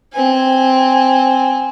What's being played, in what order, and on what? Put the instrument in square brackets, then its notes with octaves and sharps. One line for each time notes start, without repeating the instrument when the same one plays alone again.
[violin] C4 G#5